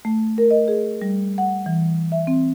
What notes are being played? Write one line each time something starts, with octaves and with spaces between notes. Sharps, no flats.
A3
A#4
D#5
G#4
G3
F#5
E3
E5
C4